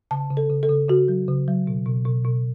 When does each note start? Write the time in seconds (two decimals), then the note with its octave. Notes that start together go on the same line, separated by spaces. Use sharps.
0.11 C#3 A5
0.31 C#3
0.37 A4
0.50 C#3
0.63 A4
0.69 C#3
0.89 C#3 F#4
1.08 F#3
1.28 C#3
1.48 F#3
1.67 B2
1.86 B2
2.05 B2
2.25 B2